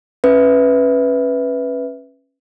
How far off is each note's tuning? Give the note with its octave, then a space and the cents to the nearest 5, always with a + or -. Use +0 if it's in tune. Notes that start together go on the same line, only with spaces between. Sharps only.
C#4 -20 B4 +0 E5 -10